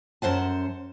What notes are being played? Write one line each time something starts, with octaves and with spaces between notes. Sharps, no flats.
F#2 C5 F#5 A5